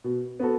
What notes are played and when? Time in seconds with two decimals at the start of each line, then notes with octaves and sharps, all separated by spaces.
0.04 B2
0.40 B3 F#4 A4